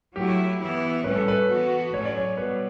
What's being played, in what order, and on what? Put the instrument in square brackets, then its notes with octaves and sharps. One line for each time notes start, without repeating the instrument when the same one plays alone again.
[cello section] F#3 A3 E4 [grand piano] G4
[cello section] E3 B3 E4
[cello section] A2 G3 C#4 [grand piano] B4
[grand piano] A4
B4
[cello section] E3 B3 F#4
[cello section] A2 F#3 C#4 [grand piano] C#5
[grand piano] D5
C#5
[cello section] B2 G3 [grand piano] B4